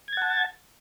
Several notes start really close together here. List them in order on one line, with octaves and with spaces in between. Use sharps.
G#6 A6 F#5 A5